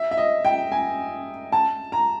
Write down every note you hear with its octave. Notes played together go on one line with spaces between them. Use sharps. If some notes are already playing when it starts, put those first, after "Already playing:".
Already playing: E5
E5
D#5
G5
G#5
A5
A#5